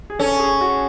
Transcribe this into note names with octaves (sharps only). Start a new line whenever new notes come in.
G#4
C#4 A4
G#4
F#4